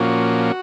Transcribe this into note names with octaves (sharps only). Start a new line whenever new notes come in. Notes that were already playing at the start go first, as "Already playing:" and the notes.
Already playing: A#2 F3 A#3 C#4 F#4